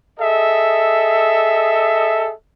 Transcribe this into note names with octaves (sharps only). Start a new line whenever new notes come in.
G#4 A4 D#5 E5